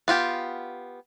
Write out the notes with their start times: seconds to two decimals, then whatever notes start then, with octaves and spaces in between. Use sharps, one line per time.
0.08 B3 F4 G4